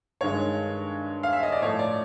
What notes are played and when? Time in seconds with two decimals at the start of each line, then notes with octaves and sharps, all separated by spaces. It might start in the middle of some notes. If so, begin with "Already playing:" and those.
0.21 G2 D#3 G#3 C#5
1.23 F5
1.33 E5
1.43 D#5
1.52 D5
1.62 A2 F3 A3 C#5
1.79 D5